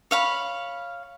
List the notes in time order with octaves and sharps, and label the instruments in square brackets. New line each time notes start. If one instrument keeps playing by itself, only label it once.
[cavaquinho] C#5 F5 B5